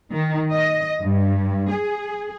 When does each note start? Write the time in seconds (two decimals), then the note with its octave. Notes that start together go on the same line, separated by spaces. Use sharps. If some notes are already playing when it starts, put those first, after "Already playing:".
0.12 D#3
0.52 D#5
1.02 G2
1.71 G#4